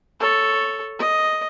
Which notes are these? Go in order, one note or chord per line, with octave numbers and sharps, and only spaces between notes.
A4 C#5
D#5